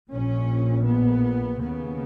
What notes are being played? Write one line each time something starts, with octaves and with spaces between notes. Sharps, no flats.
A#1 A#2 C#4
B3
D#2 C#3 B3